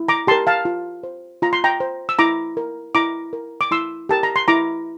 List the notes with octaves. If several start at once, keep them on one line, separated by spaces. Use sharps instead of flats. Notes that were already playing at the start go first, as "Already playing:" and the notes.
Already playing: E4
A#5 D6
G4 A#4 A5 C6
F5 A5
F4
C5
F4 A#5
C6
G5 A#5
C5
E6
E4 A#5 D6
A#4
E4 A#5 D6
A#4
D6
E4 C6 E6
G4 A#4 A5
A#5
C6
E4 A#5 D6